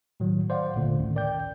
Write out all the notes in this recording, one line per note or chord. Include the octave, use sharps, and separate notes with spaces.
A2 D#3 F#3
C5 D5 F5 F#5
G1 A#2 D3 A3
D2 A2 D#3 C#4
A1 A#4 D5 G5 G6